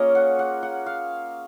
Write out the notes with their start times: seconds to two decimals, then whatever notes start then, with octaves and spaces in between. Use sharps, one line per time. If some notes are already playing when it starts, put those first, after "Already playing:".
Already playing: A#3 C#4 F4 G#4 A#4 C#5 D#5
0.15 F#5
0.39 F#5
0.63 F#5
0.86 F5